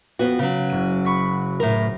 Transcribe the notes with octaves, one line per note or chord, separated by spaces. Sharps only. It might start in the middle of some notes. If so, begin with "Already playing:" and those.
F2 B3 F#4
C#3 F#3
F#1 D#7
B5 C#6 B6
A2 A#4